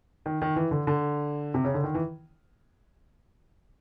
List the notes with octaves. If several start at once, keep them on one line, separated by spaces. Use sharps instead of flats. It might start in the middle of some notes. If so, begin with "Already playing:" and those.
D#3
D#3
E3
D3
D3
C3
C#3
D3
D#3
E3